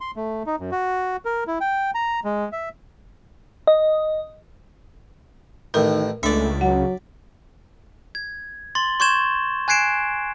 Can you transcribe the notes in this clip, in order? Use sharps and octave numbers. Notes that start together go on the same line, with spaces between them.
C6
A3
D#4
F#2
F#4
A#4
E4
G5
A#5
G#3
E5
D#5
A1 A2 D#3 A#4
C#2 A3 D4 D5 E5
F#3 F#5
G#6
C6 A6 F#7 G7
C6 C#6 G6 G#6 E7 G7
G#5 F#6 G#6 C7 D7 E7